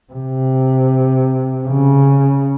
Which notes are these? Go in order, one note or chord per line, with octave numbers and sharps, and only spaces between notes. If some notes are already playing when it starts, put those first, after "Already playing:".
C3
C#3